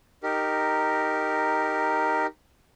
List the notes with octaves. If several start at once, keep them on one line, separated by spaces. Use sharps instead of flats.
D#4 G4 A#4